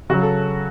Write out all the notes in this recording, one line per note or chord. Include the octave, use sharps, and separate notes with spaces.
C#3 F#3 F#4
A4